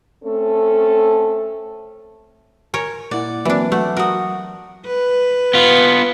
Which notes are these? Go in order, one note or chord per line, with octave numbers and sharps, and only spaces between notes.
A3 C4 C#4 A4
A#4 C#5 G#5
A#2 A#3 E4 D5 F#5
E3 F#3 A#3 C4 D4
F#3 A3 B4 F#5
F#4 A#4 D#6
B4
B3 F4